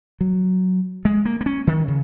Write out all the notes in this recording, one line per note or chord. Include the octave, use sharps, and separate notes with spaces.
F#3
G#3
A#3
A#3
C#4
D#3
C#3